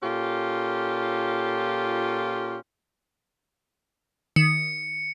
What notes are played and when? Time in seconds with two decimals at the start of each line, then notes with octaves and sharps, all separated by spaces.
0.03 A#2 C#4 F4 G4 A4
4.36 D#3 C#7